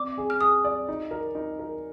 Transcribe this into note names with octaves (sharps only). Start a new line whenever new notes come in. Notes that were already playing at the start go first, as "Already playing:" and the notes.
Already playing: C4 D5 D6
G#4
F6
G#4 D#6
D5
D#4
A#4
D#4
A#4